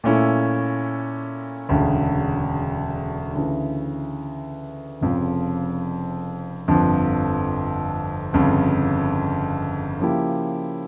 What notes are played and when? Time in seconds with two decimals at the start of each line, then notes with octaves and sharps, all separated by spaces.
0.04 A#2 A3 C#4 E4
1.69 E1 D2 C#3
3.35 D2 C#3 E3
5.01 F1 F2 C#3 F3
6.68 G1 F2 D3 F3
8.33 G1 F2 C#3
10.00 C#3 F3 A#3 E4 G4